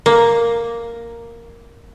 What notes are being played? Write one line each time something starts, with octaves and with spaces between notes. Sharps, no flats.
A#3